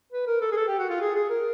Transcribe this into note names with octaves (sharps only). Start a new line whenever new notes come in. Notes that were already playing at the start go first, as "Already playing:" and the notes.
B4
A#4
A4
G#4
A4
G4
F#4
F4
G#4
G#4
A#4